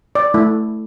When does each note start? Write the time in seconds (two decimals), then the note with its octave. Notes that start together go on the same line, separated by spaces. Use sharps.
0.15 D5
0.34 A3 E4